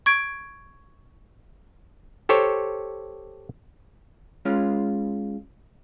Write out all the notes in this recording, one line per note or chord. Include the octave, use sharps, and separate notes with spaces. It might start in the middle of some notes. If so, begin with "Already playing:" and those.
C#6 G#6 D7
G4 A4 C5 C#5
G#3 C#4 F4